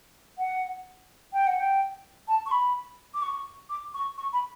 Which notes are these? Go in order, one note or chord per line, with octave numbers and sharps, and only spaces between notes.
F#5
G5
F#5
G5
A5
C#6
B5
D6
C#6
D6
C#6
C#6
B5